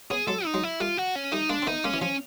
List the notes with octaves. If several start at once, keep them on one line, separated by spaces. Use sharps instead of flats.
B3 C#4 G#4
F#3 G#3 A4
D#4
F#3 G#3
E4
G3 A3 F4
F#4
C#4
G3 A3 D#4
G#3 A#3 D4
C4
A3 B3 D#4
G#3 A#3 C#4
E3
F3 C#4